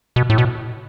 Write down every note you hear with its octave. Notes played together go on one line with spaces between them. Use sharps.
B2
A2
B2